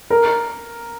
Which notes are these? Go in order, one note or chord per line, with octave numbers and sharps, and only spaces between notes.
A#4